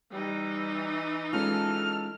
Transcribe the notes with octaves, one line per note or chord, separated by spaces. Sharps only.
E3 G3 D#4
G#3 C#4 D4 E4 F4 A4 F6